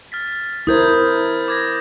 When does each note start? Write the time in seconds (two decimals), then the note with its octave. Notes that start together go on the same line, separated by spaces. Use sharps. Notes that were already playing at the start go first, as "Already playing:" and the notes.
0.12 F6 A6 B6
0.67 E4 A#4 C5 D#6 G6 G#6
1.48 D6 G#6 A#6